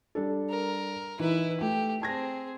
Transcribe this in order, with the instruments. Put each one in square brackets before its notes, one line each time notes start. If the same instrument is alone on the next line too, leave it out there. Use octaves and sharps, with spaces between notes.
[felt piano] G3 D4 A4
[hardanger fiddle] A#4
[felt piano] E3 D#4 [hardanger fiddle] E4 B4
[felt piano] A3 [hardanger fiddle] G4
[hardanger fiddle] C4 G#4 [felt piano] A5 G#6 A#6